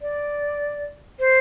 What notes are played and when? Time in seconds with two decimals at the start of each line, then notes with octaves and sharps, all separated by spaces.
0.02 D5
1.20 C5